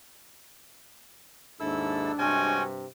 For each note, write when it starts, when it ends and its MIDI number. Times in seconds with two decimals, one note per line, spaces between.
1.60 2.10 39
1.60 2.10 44
1.60 2.53 62
1.60 2.12 64
1.60 2.12 69
1.60 2.12 88
2.18 2.85 43
2.18 2.85 48
2.18 2.63 56
2.18 2.63 61
2.18 2.63 66
2.18 2.63 79
2.18 2.63 80